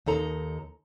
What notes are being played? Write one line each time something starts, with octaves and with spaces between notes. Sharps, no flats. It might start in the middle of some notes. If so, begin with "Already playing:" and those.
D#2 D#4 A4 A#5